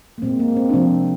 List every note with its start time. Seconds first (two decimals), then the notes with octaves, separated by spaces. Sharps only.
0.18 A#3
0.22 A#2 G#3 C4
0.39 A#3
0.56 C4
0.69 D4
0.74 C3 F3 G#3 C4